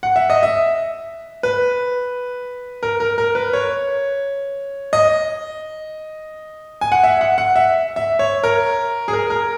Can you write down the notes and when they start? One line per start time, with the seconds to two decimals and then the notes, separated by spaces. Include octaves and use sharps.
0.03 F#5
0.16 E5
0.30 D#5
0.43 E5
1.43 B4
2.83 A#4
3.00 A#4
3.18 A#4
3.35 B4
3.53 C#5
4.93 D#5
6.81 G#5
6.92 F#5
7.04 E5
7.21 F#5
7.38 F#5
7.56 E5
7.96 E5
8.19 C#5
8.43 A#4
9.08 G#4
9.13 A#4
9.30 A#4